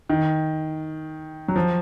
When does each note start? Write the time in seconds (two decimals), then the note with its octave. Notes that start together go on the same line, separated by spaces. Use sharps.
0.10 D#3
1.48 F#3
1.56 F3